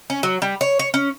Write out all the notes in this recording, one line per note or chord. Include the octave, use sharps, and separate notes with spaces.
C#4
F#3
G3
C#5
C#5
C#4